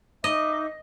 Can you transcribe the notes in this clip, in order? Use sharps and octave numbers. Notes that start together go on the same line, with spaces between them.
D#4 D#5 E5 D6